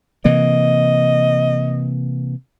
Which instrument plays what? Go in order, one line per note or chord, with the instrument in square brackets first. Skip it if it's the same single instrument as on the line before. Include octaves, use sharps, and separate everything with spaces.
[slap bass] C3 E3 A#3 [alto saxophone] D#5